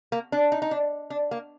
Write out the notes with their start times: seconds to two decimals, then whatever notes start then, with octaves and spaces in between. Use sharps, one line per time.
0.12 A#3
0.32 D4
0.52 D#4
0.62 D#4
0.71 D4
1.10 D4
1.31 A#3